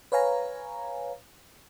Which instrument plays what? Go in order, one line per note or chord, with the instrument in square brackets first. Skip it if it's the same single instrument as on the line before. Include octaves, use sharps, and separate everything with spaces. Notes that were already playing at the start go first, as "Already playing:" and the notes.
[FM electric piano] B4 C#5 F5 G#5 A#5